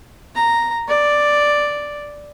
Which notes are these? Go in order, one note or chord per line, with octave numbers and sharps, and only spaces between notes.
A#5
D5